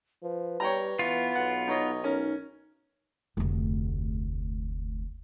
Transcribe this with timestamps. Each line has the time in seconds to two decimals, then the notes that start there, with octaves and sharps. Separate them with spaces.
0.23 F3 B4
0.60 G3 C#5 G5 A#5
0.99 E3 B3 F4
1.35 B1 F#5
1.68 D#4 C#5 D#5
2.04 C#4 D#4 A#4
3.37 F1 D2